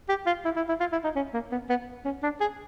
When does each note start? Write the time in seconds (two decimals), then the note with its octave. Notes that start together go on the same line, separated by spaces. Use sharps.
0.09 G4
0.26 F4
0.45 E4
0.56 E4
0.69 E4
0.80 F4
0.92 E4
1.04 D#4
1.16 C#4
1.34 A#3
1.52 B3
1.69 B3
2.05 C#4
2.23 D4
2.41 G#4